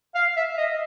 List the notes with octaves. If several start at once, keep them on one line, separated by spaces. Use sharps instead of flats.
F5
E5
D#5